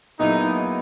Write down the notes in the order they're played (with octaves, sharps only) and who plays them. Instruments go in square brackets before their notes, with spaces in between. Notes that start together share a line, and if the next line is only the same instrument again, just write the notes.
[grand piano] A#2 F#3 B3 E4 G#4 [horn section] D#4